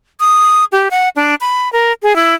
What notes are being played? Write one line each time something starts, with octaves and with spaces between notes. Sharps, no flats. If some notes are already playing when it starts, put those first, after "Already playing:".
D#6
G4
F#5
D4
B5
A#4
G#4
E4